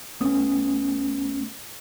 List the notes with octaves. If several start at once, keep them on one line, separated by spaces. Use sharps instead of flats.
C2 A3 B3 C#4 D#6